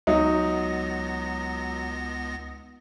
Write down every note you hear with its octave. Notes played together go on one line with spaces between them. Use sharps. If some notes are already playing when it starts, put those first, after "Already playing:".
C#2 F#3 B3 D#4 A#6